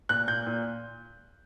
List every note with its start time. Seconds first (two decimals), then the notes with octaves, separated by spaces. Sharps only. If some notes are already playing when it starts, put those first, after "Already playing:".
0.09 A#2 F#6
0.28 A#2 G6
0.46 A#2